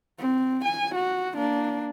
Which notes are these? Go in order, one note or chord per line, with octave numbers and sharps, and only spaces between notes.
C4
G#5
F#4
A#3 D4